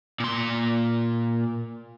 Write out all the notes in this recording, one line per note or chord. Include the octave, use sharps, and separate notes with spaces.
A#2 C6